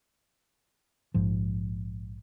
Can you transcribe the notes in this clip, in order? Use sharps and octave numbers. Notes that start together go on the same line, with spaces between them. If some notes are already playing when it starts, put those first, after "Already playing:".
A#1 G#2 F3